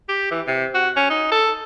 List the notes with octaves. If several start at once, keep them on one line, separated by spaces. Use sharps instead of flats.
G4
E3
C3
F#4
C#4
D#4
A4